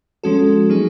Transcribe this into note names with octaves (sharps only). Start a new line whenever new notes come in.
F3 G#3 C#4 F#4 A4
F#3 A#3 D#4 G#4